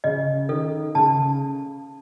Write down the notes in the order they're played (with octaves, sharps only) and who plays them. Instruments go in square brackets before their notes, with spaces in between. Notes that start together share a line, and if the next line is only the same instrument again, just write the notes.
[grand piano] C#3 [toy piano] D#5
[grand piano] D#3 [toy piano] A4
[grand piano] C#3 [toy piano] A5